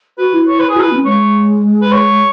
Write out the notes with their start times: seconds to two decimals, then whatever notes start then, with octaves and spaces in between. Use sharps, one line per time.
0.18 F#4 B4
0.34 E4
0.48 C#5
0.59 B4
0.69 G#4
0.76 F#4 B4
0.85 E4
0.92 B3
0.95 C#4
1.05 G#3 C#5
1.82 B4
1.92 C#5